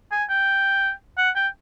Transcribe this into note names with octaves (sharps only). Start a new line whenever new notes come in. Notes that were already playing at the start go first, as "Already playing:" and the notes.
G#5
G5
F#5
G5